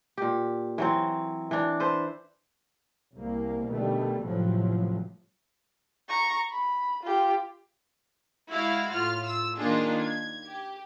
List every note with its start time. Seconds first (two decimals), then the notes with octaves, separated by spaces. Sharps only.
0.18 A#2 G4
0.78 E3 F#3 C4
1.51 E3 D4
1.80 A4 B4 C5
3.15 C2 A#3
3.69 B2 D3 D#3 G3 A3
4.23 A1 A2 C3 F3 F#3
6.09 A#5 C#6
6.51 B5
7.03 F4 G4
8.50 G#3 E4 F#4 F5
8.92 A2 F4 F6
9.27 E6
9.58 D#3 A#3 D4 D#4 F4 G#4
10.01 G#6
10.45 G4